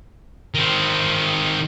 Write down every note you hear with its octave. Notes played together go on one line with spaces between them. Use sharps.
D#3 C4